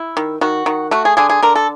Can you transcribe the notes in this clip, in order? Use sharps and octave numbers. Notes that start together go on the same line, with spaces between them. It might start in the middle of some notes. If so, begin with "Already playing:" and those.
Already playing: E4
D#3
D#3 F#4
D#3
A3 F#4
G#4
D3 G#4
G#4
D3 A#4
A4